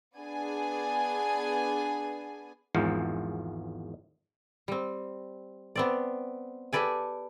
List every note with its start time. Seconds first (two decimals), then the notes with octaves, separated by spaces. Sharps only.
0.16 B3 D4 G#4 G#5
2.75 G#1 E2 G#2 F3
4.68 G3 C4
5.75 B3 C4 D5
6.73 G4 A4 B4 D5 G#5